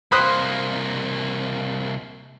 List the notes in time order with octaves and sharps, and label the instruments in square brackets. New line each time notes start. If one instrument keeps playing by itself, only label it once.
[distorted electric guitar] C2 A#3 [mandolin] C5 [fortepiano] B5 D#6 F#6